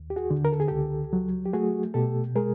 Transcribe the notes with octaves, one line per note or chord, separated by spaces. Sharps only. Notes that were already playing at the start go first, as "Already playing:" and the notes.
Already playing: D#2
G4
F#4 G#4
D3
A#4
A4
G#4
C#2 G4 A4
F#3
G4
A3 F#4 G#4
B2 G4 A4
G#3 G#4 A#4